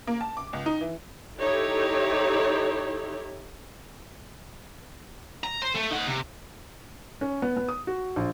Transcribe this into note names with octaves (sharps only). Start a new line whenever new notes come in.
A#3
A5
D6
C#2
D#4
E3
D#4 E4 G4 A4 C#5
A#5
C5
A3
D#4 F#5
C3
C#4
B3
B3
D#6
F#4
A#1